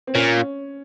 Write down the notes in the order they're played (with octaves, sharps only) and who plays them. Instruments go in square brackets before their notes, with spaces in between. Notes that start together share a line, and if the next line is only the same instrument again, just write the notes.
[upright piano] C4
[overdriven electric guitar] A#2 [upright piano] C#4